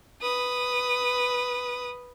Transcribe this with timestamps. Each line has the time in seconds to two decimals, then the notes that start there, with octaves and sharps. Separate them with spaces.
0.21 B4 D#6